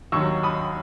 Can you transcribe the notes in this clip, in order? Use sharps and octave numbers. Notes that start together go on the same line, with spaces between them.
D#2 D#3 F#3 C#6 E6
B5 D#6